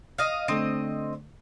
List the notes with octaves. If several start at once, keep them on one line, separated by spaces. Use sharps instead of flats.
D#5 F5
D3 A3 C4 D#5